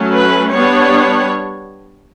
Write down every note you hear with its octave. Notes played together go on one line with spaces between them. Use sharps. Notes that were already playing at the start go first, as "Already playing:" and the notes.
Already playing: F#3 A3 C#4
B4
G3 B3 D4 C#5